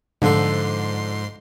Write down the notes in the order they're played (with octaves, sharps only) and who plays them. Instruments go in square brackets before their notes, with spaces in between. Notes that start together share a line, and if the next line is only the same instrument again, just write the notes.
[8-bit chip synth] G#2 C6 C7 [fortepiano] D3 [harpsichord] F3 A3 A4